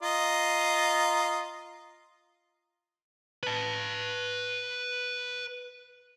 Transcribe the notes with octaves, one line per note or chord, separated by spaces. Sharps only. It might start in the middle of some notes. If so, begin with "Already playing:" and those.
F4 D#5 A#5
B4 A5